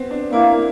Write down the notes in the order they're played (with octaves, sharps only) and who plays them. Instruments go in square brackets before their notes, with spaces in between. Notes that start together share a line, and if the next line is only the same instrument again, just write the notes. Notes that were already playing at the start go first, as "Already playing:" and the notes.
Already playing: [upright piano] B3 C4
D4
[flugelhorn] A#3 [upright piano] E4